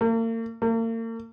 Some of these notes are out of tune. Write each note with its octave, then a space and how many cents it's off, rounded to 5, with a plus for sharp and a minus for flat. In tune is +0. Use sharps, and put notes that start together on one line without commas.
A#3 -40
A#3 -40